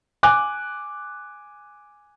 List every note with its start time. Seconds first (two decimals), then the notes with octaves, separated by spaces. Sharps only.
0.23 G#5 D6 F#6